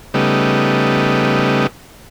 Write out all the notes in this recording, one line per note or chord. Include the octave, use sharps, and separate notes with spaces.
C#3 G3 A3 B3 D#4